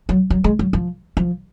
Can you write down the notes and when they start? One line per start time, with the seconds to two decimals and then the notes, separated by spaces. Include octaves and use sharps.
0.09 F#3
0.30 F#3
0.44 G#3
0.59 F#3
0.73 F3
1.17 F3